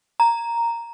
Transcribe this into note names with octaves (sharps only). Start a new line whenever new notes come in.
A#5